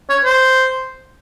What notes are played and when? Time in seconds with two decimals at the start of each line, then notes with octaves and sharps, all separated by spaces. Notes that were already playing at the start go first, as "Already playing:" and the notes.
0.09 C#5
0.25 C5